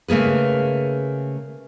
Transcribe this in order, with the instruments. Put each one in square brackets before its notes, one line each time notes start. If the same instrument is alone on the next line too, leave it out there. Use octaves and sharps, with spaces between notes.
[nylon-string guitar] C#3 A3 A#3 G#4 B4